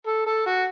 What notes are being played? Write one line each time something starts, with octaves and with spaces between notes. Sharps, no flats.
A4
A4
F#4